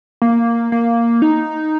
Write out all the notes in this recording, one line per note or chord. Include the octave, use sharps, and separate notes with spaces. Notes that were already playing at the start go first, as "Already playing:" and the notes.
A#3
A#3
D#4